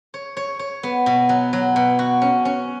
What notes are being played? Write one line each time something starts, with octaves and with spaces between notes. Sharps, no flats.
C#5
C#5
C#5
B3
B2
F#3
F#3
B2
F#4
C#4
C#4